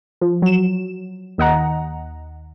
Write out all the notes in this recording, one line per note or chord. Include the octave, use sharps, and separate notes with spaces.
F3
F#3 E7
D#2 D#5 F#5 A#5